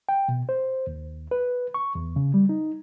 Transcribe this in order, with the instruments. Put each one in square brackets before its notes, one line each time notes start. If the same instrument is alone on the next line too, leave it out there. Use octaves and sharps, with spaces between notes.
[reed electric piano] G5
B2
C5
D#2
B4
C#6
E2
C#3
G3
D#4